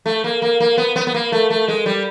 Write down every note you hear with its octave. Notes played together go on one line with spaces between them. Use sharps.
A3
A#3
A#3
A#3
B3
B3
B3
A#3
A3
A3
G#3
G3